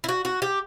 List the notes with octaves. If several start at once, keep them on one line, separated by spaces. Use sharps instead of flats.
E4
F#4
F#4
G4